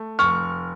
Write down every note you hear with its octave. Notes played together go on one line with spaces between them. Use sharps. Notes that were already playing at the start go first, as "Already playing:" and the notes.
Already playing: A3
F1 C#6 F6